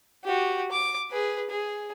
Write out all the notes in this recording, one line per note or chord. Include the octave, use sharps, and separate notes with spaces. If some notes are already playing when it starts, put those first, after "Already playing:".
F#4 G4
D6
G#4 B4
G#4